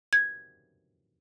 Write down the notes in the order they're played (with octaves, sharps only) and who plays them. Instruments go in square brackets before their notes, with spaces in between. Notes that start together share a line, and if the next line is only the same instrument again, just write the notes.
[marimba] G#6